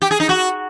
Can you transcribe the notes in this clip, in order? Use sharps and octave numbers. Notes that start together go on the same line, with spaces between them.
G4
G#4
D#4
F#4